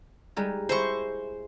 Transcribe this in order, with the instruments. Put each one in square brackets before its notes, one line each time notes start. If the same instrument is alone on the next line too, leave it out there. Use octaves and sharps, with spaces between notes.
[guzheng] G3 G#3 D#4
[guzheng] G#3 E4 [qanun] C5 C#6